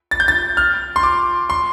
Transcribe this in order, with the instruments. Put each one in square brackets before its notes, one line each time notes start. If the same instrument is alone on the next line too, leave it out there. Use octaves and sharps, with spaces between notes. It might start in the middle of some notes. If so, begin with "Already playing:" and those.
[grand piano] A6
G6
A6
F6
C6
D6
C6